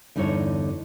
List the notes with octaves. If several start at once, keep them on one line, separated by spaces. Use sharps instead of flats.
E2 G2 D3 D#4 E4 C#5